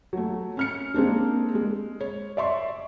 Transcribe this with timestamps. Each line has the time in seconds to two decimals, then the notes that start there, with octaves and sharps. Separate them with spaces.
0.13 F#3 A3
0.57 C#4 F6 C#7
0.94 G#3 A#3 C4 D4
1.55 G#3
2.01 C#5
2.37 D5 E5 C6 C#6